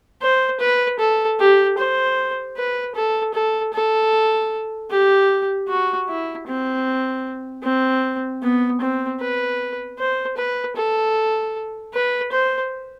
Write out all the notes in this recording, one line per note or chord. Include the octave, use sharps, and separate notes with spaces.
C5
B4
A4
G4
C5
B4
A4
A4
A4
G4
F#4
E4
C4
C4
B3
C4
B4
C5
B4
A4
B4
C5